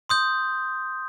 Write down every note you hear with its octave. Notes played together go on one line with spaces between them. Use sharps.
C6 D#6 G6